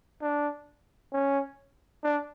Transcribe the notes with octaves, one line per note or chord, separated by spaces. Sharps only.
D4
C#4
D4